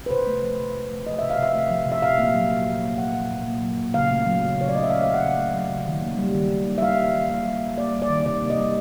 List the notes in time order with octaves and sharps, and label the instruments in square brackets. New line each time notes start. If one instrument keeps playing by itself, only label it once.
[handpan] B4
C3 C5
A3
F3
C3
C3
A3
F3 D#5
E5
C3
F5
C3 E5
A3
F3
C3
E5
A#2 F5
A#3
F#3
A#2
A#2
A#3
F#3 F#5
A#2
A#2
A#3
F#3
A#2
C#3 F5
A3
F#3
C#3
C#3 C#5
D5
A3 D#5
E5
F#3 F5
C#3 F5
F#5
C#3
A3
F#3
C#3
D#3
A#3
G3
D#3
D#3
A#3
E5
G3 F5
D#3
D#3
A#3 E5
G3
D#3
A#3 D5
G3
D5
D#3
C3 D5
A#3
D#5
G3